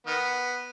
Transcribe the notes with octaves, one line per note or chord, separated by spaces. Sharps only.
D#3 B3